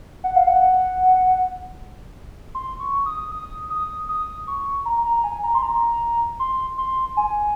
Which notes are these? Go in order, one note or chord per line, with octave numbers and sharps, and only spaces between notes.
F#5
F5
F#5
C6
C#6
D#6
D#6
D#6
D#6
C#6
A#5
A#5
G#5
A#5
C6
A#5
C6
C6
G#5